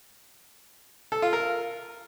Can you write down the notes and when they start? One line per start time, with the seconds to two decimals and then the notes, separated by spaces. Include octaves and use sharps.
1.12 A4
1.22 F4
1.33 A#4